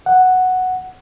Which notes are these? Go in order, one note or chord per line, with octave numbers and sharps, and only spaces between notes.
F#5